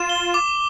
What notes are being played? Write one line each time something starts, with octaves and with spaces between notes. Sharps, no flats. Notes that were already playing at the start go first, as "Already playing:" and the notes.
Already playing: F4 E7
G7
D6